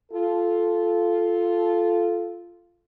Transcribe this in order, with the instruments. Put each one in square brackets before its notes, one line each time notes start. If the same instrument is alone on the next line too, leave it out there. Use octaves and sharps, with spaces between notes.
[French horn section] F4 A4